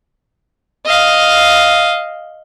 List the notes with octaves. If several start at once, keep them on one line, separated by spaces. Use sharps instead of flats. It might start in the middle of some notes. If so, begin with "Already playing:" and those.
D#5 F5